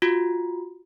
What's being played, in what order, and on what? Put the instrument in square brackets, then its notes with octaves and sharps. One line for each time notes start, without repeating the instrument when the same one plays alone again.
[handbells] F4 F#4